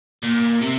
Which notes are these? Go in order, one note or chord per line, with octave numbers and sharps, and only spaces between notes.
A#2
C3